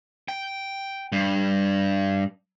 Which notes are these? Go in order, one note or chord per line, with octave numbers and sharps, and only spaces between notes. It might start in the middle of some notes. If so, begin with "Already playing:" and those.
G5
G2